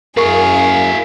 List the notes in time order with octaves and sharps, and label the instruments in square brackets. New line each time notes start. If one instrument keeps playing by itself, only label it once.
[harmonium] F#2 A#3 [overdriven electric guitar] E4 F5 [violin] G#4 [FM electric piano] A#4 C#6